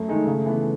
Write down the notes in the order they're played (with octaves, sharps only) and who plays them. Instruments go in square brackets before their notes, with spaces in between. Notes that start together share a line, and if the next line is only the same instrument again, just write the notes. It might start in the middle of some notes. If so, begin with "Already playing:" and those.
Already playing: [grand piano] F#2 [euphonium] A3
[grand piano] D#3 G#3 D#4 G#4
C#3
E3 B3